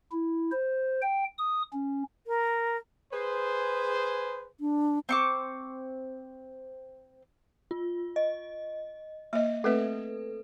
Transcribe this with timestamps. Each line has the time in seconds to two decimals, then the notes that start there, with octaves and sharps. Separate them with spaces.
0.12 E4
0.52 C5
1.02 G5
1.38 D#6
1.73 C#4
2.27 A#4
3.12 G#4 B4 C5
4.60 D4
5.09 C4 C#6 D6
7.71 F4
8.16 D#5
9.33 A#3 D#5 E5
9.64 A3 C4 A4 B4 E5